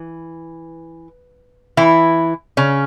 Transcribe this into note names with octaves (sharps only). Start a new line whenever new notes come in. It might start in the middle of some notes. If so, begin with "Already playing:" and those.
Already playing: E3
E3 E4
C#3 C#4